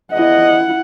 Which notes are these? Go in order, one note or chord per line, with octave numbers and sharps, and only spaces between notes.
E2 E4 D#5 F#5